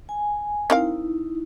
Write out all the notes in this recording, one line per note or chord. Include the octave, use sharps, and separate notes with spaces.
G#5
C4 D#4 E4 A#4 F5